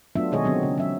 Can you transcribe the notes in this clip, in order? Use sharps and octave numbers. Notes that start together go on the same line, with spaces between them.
F#3 A3 B3 D4 F4 E5
B2 D#3 G#3 G#4 C#5 D#5
D3 F#3 B3 C4
C#3
F#3 E5